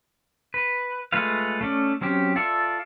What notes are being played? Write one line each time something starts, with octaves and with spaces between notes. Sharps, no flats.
B4
G#3 A3 F4 B4 F5
A3 C#4 D5
F#3 C4 C#4 G4
F4 A4 D5 E5